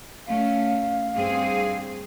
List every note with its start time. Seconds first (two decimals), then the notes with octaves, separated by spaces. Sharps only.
0.28 A3 C#4 F5
1.15 G2 C4 G#4